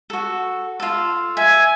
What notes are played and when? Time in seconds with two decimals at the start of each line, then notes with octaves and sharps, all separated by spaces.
0.10 F#4 A4
0.80 F4 A4
1.37 E5 G#5